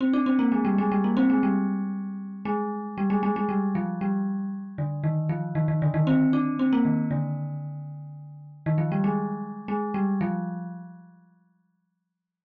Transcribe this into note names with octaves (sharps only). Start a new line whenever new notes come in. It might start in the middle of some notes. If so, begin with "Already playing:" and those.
C4
D4
C4
A#3
G#3
G3
G#3
G3
A#3
C4
G#3
G3
G#3
G3
G#3
G#3
G#3
G3
F3
G3
D3
D#3
F3
D#3
D#3
D3
D#3
C4
D4
C4
A#3
D#3
D3
D#3
F3
G3
G#3
G#3
G3
F3